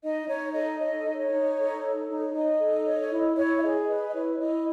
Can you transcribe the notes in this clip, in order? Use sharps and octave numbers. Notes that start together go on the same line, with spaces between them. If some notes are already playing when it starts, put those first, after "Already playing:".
D#4 D#5
D#4 C#5
A4 D#5
C#5 D#5
D#4
C#5
D#4
A4
C#5
D#4
D#4 D#5
A4
C#5
C#5
E4 D#5
E4 C#5
E5
G#4 D#5
B4 D#5
D#5
E4 C#5
E4 D#5